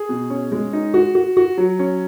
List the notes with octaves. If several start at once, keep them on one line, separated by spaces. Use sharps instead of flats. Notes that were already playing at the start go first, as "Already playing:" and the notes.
Already playing: G#4
B2
C#4
G#3
D#4
F#4
F#4
F#4
F#3
C#4